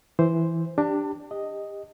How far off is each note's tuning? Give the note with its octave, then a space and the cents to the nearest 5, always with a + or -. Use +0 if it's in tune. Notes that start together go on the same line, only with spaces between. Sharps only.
E3 +0 C5 +0
D4 +0 G4 +5 A5 +35
G4 +30 D#5 +0